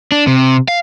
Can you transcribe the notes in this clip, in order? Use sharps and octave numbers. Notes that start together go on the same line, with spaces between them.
D4
C3
F5